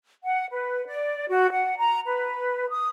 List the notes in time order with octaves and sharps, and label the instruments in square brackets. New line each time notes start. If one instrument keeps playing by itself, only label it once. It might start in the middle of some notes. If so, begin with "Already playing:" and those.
[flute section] F#5
B4
D5
F#4
F#5
A#5
B4
D#6